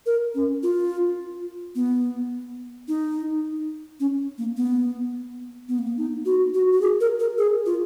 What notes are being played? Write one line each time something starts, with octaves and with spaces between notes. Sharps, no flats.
A#4
C#4
F4
B3
D#4
C#4
A#3
B3
B3
A#3
B3
D#4
F#4
F#4
F#4
G#4
A#4
A#4
G#4
F4